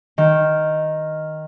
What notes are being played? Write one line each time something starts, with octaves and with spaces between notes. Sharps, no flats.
D#3